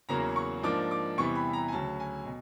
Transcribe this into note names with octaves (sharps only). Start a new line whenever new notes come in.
E2 C#3 F#3 A#3 A#5
C#6
G#2 F3 A#3 D4 D6
D6
E2 C3 E3 G3 B3 C#6
B5
A#5
G#5
D2 C#3 F#3 A5
G#5
B2